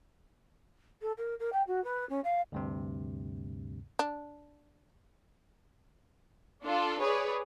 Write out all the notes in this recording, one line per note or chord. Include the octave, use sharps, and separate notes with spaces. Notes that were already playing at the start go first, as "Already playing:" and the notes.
A4
A#4
A#4
G5
F#4
B4
C#4
F5
D2 G2 C3
D4
D4 F4 A4
G#4 B4 C#5 D5